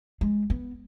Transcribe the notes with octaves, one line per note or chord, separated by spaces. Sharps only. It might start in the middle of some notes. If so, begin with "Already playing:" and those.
G#3
B3